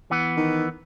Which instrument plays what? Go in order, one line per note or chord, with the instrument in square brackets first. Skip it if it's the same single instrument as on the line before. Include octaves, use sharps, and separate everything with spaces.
[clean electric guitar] E3 B3
[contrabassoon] D#3